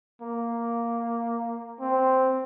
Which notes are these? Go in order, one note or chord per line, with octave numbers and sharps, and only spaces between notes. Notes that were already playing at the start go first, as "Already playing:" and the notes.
A#3
C4